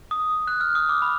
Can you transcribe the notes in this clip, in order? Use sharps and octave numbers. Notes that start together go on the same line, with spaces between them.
D#6
F#6
F6
D#6
D6
B5